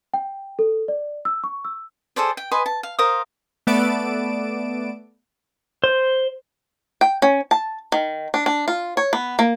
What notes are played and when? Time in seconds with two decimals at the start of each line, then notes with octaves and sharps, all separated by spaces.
0.14 G5
0.59 A4
0.88 D5
1.25 E6
1.44 C#6
1.65 E6
2.16 G#4 A4 C5 D5
2.37 G5
2.51 B4 D#5 G#5 C6
2.66 A5
2.83 F5
2.99 A#4 C5 F5 D#6
3.67 A3 B3 D5 D7 E7
5.84 C5
7.01 G5
7.22 C#4
7.51 A5
7.92 D#3
8.34 D4
8.46 D4
8.68 F4
8.97 C#5
9.13 B3
9.39 A#3